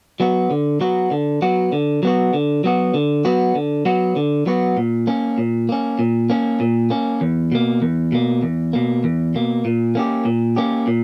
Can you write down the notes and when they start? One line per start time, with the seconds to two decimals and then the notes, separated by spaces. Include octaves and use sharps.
0.20 F#3 B3 F#4
0.50 D3
0.81 F#3 B3 F#4
1.11 D3
1.42 F#3 B3 F#4
1.72 D3
2.03 F#3 B3 F#4
2.34 D3
2.64 F#3 B3 F#4
2.94 D3
3.25 F#3 B3 F#4
3.55 D3
3.85 F#3 B3 F#4
4.16 D3
4.46 F#3 B3 F#4
4.77 A#2
5.07 A#3 C#4
5.38 A#2
5.69 A#3 C#4
5.99 A#2
6.30 A#3 C#4
6.60 A#2
6.90 A#3 C#4
7.21 E2
7.52 B2 A#3
7.82 E2
8.12 B2 A#3
8.43 E2
8.73 B2 A#3
9.04 E2
9.35 B2 A#3
9.65 A#2
9.95 A#3 C#4 G4
10.25 A#2
10.56 A#3 C#4 G4
10.87 A#2